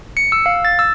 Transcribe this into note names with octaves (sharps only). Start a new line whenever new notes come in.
C#7
E6
F5
A6
E6